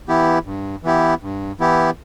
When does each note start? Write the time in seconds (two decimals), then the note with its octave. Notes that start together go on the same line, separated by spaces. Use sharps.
0.08 E3 B3 E4 G4
0.45 G2
0.84 E3 B3 E4 G4
1.22 G2
1.60 E3 B3 E4 G4